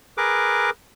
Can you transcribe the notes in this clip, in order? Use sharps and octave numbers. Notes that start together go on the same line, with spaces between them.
G#4 A#4 B4 D6